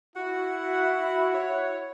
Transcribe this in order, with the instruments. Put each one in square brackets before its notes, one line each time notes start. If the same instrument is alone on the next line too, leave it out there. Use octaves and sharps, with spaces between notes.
[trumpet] E4 [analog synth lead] F#4 [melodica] F#5
[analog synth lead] C#5